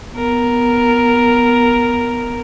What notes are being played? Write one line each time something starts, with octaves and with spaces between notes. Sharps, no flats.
B3 A#4